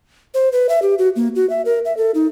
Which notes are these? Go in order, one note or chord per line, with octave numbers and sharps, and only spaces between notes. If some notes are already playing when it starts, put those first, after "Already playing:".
C5
B4
E5
G4
F#4
A#3
F#4
E5
A#4
E5
A4
D#4